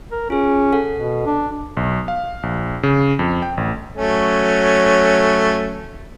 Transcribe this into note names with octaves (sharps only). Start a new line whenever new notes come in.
A#4
C#4 F4 G#4
A4 F#5
B2
D4
B1
F5
A#1
C#3
F2
G5
A1
F#3 A3 C#4